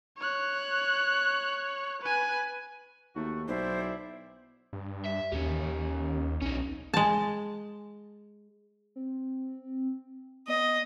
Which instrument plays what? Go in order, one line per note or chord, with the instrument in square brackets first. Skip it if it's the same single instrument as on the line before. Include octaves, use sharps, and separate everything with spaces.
[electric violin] C#5 F#6
B4 G#5
[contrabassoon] D#2 [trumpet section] A3 F#4
[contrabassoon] B1 [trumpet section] E4 D5 E5 [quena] C5
[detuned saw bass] G2
[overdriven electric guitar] E5
[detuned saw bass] D#2 [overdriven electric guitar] C#4 G4
[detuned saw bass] B1 [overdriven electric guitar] C#4 D#4
[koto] G#3 A5
[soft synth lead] C4
[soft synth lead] B3 [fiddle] D#5